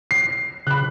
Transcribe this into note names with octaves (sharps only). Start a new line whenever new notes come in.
C7
C#3 B5 F#6